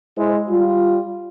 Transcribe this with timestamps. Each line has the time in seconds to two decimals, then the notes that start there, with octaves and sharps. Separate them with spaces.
0.17 G#3 E4 C5
0.49 G3 F4